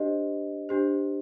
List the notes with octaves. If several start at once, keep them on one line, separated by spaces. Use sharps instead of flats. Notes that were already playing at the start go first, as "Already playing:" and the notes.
Already playing: D4 G4 C5 D#5
D4 G4 C5